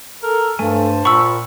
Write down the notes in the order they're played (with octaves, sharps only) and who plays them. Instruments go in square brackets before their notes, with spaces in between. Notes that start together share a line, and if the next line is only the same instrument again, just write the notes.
[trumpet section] A4 [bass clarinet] A#4
[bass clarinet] G2 [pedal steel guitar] A3 G#5 [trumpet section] C5 A5
[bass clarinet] A#2 [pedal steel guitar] A#4 F#5 B5 [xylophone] C#6 E6